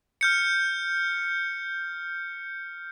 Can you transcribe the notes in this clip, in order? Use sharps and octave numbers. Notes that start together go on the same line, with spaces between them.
F6 G6 C#7